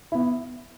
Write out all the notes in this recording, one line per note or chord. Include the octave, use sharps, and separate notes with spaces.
B3 E4